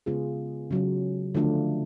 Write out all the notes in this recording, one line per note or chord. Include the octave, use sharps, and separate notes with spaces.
C#3 G#3 B3 F4 G#4
C#3 F#3 C#4
D3 F3 A3 D4 F4